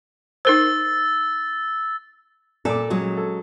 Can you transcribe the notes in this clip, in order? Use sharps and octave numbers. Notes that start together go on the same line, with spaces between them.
D#4 A#4 C5 E6 A6
A#2 A4 D6
F#3 G#3 C#4
A4